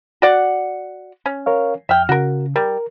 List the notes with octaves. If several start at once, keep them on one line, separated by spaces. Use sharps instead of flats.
F#4 D5 F#5
C#4
A#4 C#5 F5
F2 E5 G5 F6
C#3 F#4 A#4
G3 A#4